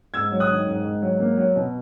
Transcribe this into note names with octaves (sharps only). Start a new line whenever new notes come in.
G#2 E6 G#6
F#3
D#6 F#6
D#3
G#2
G#2
F#3
A#3
F#3
B2